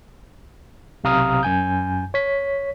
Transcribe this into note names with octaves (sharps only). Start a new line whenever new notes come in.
B1 C3 F5 A#5 D#6 F6
F#2 G#5 G6
C#5 B6